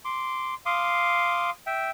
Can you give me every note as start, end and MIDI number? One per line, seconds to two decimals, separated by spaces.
0.05 0.54 84
0.05 0.54 86
0.66 1.50 77
0.66 1.50 84
0.66 1.50 86
0.66 1.50 87
1.66 1.91 76
1.66 1.91 79